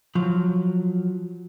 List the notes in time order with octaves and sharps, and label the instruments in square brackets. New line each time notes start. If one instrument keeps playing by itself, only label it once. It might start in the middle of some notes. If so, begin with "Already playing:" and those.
[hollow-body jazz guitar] F3 F#3